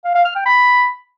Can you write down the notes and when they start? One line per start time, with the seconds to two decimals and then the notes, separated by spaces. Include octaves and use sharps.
0.05 F5
0.15 F5
0.25 F6
0.35 G5
0.46 B5